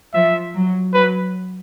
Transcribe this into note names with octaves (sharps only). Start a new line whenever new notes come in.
F3 E5
F#3
F#3 B4